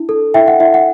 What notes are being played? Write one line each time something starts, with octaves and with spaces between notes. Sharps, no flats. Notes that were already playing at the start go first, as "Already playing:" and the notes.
Already playing: D4 E4
A4
E4 E5 G5
F#5
E4 E5
F#5